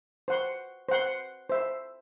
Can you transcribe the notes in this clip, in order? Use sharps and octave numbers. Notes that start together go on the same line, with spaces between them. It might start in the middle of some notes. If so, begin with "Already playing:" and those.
C5 F#5 C6
C5 F#5 C6
C5 E5